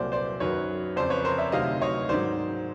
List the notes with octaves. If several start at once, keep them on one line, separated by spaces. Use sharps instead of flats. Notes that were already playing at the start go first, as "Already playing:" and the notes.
Already playing: C2 A#2 F#3 C5 D5
C5 D5
F#2 D#3 F#3 B4 C#5
F2 C#3 F3 C5 D5
B4 C#5
A#4 C5
D5 E5
D2 C3 D#3 F#3 D#5 F5
C#5 D#5
G#2 D#3 F#3 C5 D5